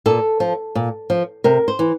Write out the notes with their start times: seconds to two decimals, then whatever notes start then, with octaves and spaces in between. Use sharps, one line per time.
0.06 A#2 A4
0.40 F3
0.75 A#2
1.10 F3
1.44 C3 A#4
1.68 C5
1.79 E3